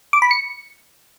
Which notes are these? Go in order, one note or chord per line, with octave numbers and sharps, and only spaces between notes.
D6
B5
C#7